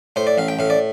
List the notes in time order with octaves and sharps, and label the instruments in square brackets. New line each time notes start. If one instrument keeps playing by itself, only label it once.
[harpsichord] A2 C5
D5
A1 F5
G5
A2 F5
D5